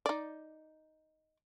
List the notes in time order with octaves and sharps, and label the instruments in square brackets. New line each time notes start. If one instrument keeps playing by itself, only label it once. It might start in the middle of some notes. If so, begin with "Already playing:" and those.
[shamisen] D#4 D5